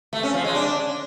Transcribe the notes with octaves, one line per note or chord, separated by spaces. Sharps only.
A3
C#4
F3
G#3
D4